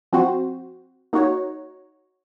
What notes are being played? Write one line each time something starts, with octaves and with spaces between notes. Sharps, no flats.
F3 C4 F#4 C5
A#3 D#4 F#4 C#5